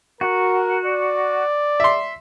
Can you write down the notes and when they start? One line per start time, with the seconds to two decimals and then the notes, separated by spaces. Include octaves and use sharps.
0.21 F#4 A#4
0.85 D5
1.80 E5 C6